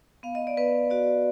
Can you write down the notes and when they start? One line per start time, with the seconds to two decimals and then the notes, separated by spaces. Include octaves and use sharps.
0.23 B3 F5
0.35 D#5
0.47 D5
0.57 B3 B4
0.90 F#4 D5